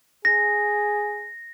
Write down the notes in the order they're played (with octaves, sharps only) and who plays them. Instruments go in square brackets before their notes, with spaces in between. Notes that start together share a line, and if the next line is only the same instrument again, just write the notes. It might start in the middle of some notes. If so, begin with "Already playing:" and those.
[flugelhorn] G#4 [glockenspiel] A#6